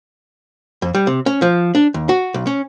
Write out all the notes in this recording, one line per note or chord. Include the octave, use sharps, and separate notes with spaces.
F2
G3
C3
C#4
F3
D4
D#2
F#4
B1
C#4